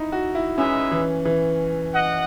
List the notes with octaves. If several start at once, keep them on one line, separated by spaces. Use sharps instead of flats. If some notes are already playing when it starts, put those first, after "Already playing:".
Already playing: D#4 E4
F#4
E4
G#3 C#4 D#4 G#4 B4 E5
E3
E3
D#5 F#5